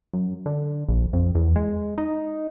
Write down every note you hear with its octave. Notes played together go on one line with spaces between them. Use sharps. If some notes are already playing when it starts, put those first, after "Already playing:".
F#2
D3
A#1
F2
E2
G#3
D#4